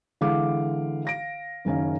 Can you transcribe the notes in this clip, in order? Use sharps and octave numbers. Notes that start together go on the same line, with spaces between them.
D3 E3 G#3 F5 D6
F5 A#6 D7
F#1 D#3 C#4 F5